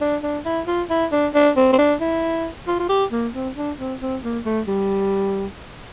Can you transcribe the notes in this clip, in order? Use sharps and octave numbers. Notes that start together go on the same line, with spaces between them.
D4
D4
E4
F4
E4
D4
D4
C4
C4
D4
E4
F4
F4
G4
A#3
C4
D4
C4
C4
A#3
A3
G3